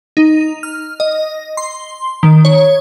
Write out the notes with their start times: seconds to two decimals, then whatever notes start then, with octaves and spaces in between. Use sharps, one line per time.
0.17 D#4
0.63 F6
1.00 D#5
1.57 C6
2.23 D#3
2.45 C#5